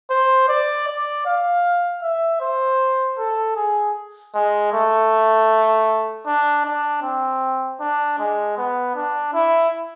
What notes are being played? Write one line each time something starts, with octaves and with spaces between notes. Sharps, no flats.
C5
D5
D5
F5
E5
C5
A4
G#4
G#3
A3
D4
D4
C4
D4
G#3
B3
D4
E4